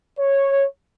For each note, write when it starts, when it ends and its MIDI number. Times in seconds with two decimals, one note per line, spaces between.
0.20 0.66 73